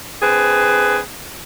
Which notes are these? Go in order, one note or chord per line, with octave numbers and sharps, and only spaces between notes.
D3 C4 G#4 B4